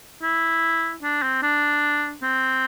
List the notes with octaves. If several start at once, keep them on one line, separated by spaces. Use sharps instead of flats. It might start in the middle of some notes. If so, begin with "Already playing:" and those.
E4
D4
C4
D4
C4